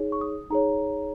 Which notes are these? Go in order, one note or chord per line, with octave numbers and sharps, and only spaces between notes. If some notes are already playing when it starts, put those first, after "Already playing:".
Already playing: D#4 G#4 C#5
C#6
D#6
D#4 G#4 C#5 A#5